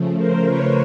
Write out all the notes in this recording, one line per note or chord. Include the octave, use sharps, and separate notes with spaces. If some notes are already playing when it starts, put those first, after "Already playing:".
Already playing: C#3 F3 A3
A#4 C5
B4 C#5